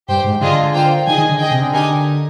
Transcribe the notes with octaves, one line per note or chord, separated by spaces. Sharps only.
G2 G4 C5 G5
G#2
D3 D4 F4 G#4 D#5
A#3 F4 C5 G5
D#3 G#4 D#5 G#5
D#3
D3
G#4 D#5 G5
C3
D3
D#4 G4 A#4 D#5 G#5